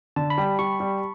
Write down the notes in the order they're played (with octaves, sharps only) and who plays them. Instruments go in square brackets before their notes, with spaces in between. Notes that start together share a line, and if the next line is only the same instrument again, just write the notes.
[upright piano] D3 [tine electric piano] A5
[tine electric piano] B5
[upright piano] G3
[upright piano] G3 [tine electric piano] C#6
[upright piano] G3